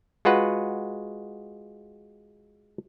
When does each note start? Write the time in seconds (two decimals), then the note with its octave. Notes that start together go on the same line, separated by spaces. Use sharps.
0.25 G#3 F4 F#4 B4 F#5